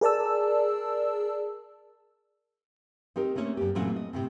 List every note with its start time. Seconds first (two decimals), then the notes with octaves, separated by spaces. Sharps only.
0.01 G#4 A#4 D5 A5 E6
3.16 C4 D#4 G4 A#4
3.35 A3 A#3 C4 C#4 C#5
3.57 F#2 G4
3.75 A#2 E3 F#3 A3 C4 C#4
3.96 D#5
4.13 A2 C3 E3 C4